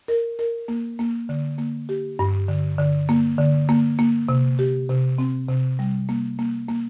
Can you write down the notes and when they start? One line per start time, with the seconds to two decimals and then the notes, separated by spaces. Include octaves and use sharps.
0.08 A#4
0.39 A#4
0.68 A#3
0.99 A#3
1.29 D3
1.58 A#3
1.89 G4
2.19 G2
2.48 D3
2.79 D3
3.09 A#3
3.39 D3
3.69 A#3
3.99 A#3
4.29 C3
4.59 G4
4.89 C3
5.18 C4
5.49 C3
5.79 G3
6.09 A#3
6.39 A#3
6.68 A#3